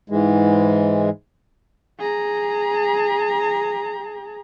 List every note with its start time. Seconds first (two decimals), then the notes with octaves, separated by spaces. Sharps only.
0.10 G#2 E3 G#3
1.99 G#4 A#5